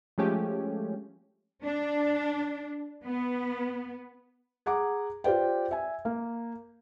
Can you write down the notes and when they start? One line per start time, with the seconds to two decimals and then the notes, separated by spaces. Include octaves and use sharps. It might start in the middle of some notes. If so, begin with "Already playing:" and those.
0.18 F3 G#3 A3 C#4 G4
1.63 D4
3.04 B3
4.66 G#4 F#5 A#5 D6
5.24 F4 G4 C5 D5 G5
5.71 E5 G#5
6.05 A#3